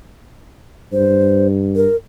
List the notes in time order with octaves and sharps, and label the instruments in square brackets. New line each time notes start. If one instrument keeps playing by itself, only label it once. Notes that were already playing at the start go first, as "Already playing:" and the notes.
[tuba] G2 [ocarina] C5
[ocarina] A#4